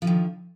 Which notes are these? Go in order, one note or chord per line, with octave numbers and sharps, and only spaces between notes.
D3 D#3 F3